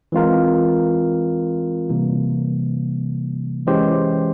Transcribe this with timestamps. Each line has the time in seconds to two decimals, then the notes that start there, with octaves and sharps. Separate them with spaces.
0.12 E3 G#3 C4 F4 A#4
1.90 C3 E3 G3 A#3
3.67 E3 G#3 C#4 G4 C5